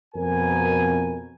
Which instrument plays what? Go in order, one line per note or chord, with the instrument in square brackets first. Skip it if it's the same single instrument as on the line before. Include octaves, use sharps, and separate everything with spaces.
[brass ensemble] F2 B2 A#4 G#5